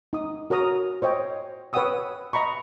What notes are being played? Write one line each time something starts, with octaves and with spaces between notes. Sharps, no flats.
D#4 D#6
F#4 A#4 C#5 A#5 D#6
C5 C#5 D#5 G5
B4 C#5 F#5 G5 D#6 E6
D#5 A#5 B5 C#6